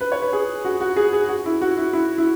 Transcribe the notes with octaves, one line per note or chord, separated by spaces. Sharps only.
B4
C#5
B4
G#4
F#4
F#4
G#4
G#4
F#4
E4
F#4
E4
E4
E4